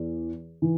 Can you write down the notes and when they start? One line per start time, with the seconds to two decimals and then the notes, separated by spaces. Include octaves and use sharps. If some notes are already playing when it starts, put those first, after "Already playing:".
Already playing: E2
0.62 E3